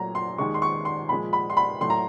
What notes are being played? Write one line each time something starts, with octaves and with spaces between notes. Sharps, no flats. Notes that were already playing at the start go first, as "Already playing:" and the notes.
Already playing: A#2 F#3 A3 A#5
C6
D#2 D#3 G#3 C#6
C6
C#6
C6
A#2 F3 G#3 B5
B5
C6
B5
A2 F#3 A3 C6
A#5